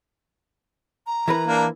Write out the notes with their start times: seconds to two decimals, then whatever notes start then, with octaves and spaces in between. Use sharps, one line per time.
1.07 A#5
1.28 E3 A#4 B4
1.47 A#3 D4